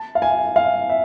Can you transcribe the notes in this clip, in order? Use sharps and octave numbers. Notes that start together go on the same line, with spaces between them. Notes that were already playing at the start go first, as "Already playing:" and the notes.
Already playing: A5
F5
G#5
F5
E5